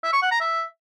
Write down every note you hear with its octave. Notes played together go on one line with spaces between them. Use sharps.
E5
C#6
F#5
A#5
E5